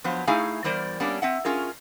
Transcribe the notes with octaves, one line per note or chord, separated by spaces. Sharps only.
F3 F#3 B3 C5
A3 D#4 E4 G#4 F5 G#5
E2 G3 A#4 C5 D5
G3 A#3 B3 C#4 D4
C4 E5 F#5
C#4 F4 G#4 A#4